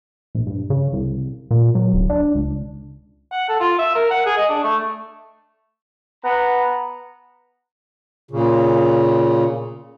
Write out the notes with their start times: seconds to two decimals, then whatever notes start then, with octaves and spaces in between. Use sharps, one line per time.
0.35 A#1
0.47 G2
0.70 C#3
0.93 C2
1.51 A#2
1.75 F#3
1.93 D1
2.10 D4
2.35 C#2
3.32 F#5
3.49 A4
3.60 F4
3.79 E5
3.95 A#4
4.11 F#5
4.26 G#4
4.38 D#5
4.49 D4
4.64 A3
6.23 B3 F#5 A#5
8.31 A#2 C#3